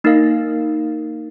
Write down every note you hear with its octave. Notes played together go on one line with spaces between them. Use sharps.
A#3 D#4 A#4 F5